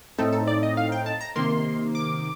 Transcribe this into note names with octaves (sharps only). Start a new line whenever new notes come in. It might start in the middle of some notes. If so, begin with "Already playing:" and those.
A2 A3 C4 D#4 A4
A4
D5
D#5
F5
G5
A5
A#5
C3 D#3 A#3 C6
D6